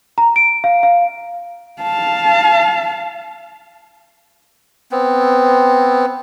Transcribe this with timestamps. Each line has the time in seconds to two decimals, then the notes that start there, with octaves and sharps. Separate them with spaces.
0.18 A#5
0.36 D7
0.64 F5
0.83 F5
1.82 F5 A5
4.91 B3 C4